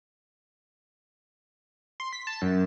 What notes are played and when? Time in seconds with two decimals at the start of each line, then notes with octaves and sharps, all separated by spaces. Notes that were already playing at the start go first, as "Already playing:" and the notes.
2.00 C6
2.13 B6
2.27 A5
2.42 F#2